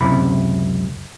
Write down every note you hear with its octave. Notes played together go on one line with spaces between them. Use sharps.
C#2 F#2 C3 E4 B5